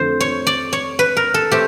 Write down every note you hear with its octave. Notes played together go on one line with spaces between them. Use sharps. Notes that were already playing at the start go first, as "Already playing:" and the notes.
Already playing: F2 D3 A3 C5
C#5
D5
C#5
B4
A#4
A4
A3 C4 G4